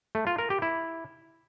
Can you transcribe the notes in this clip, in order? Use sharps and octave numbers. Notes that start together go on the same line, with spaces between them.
A3
F4
A#4
G4
E4